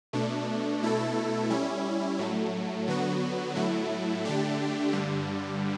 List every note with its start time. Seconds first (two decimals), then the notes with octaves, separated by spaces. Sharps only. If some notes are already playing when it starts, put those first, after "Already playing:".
0.13 B2 A3 D4
0.81 B2 A3 E4 A4
1.50 G3 C#4 E4
2.19 A2 F#3 A3
2.88 D3 F#3 B3 F#4
3.55 A2 F#3 A3 E4
4.25 D3 A3 D4 G4
4.93 G2 D3 G3